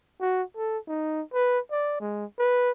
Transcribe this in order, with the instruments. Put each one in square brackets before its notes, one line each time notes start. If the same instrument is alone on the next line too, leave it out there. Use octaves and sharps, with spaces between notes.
[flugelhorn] F#4
A4
D#4
B4
D5
G#3
B4